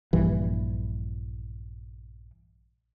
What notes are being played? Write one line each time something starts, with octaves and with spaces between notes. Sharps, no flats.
A#1 G2 E3